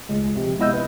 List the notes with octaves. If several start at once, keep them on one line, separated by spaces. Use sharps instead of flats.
C#2 G#3
C3 F3
G#3 B3 E4 D#5 E6 G6
B4